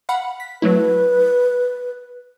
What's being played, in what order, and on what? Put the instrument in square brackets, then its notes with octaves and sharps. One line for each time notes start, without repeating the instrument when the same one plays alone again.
[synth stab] F5 F#5 B5
B6
[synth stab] F#3 A3 E4 [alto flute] B4